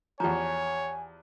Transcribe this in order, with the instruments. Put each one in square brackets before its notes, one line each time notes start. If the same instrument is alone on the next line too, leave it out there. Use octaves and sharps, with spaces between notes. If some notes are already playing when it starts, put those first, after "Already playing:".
[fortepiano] E2 F3 [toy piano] G4 A#5 [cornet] C#5 [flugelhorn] G#5